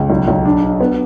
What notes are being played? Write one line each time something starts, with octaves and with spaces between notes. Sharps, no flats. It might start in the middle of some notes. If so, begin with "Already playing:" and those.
Already playing: C#2
B1
B1
D4
D4
B3